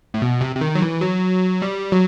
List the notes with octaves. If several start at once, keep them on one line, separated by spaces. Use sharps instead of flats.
A2
B2
C3
C3
D#3
F#3
E3
F#3
G3
F#3